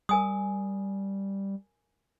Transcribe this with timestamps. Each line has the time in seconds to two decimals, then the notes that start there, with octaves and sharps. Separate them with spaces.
0.09 G3 A#4 G#5 D#6